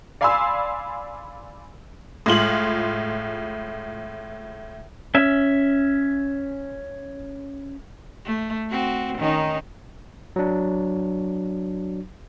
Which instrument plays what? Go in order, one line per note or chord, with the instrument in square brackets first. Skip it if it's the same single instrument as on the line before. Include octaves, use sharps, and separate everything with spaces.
[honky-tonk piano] D5 F5 G#5 B5 C6 E6
A2 G#3 F4 F#7
[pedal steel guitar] C#4 E5
[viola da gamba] A3
C4 F#4
D#3 C#4 D#4
[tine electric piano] F#3 D4